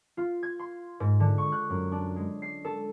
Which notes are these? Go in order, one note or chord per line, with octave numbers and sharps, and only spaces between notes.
F4
G#6
C6
G#2
D3
C#6
F#6
F#2
D4
G#3
C7
A4